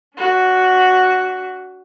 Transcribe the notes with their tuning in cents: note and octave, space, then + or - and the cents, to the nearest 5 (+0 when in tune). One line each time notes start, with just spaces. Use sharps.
D4 -40 F#4 +0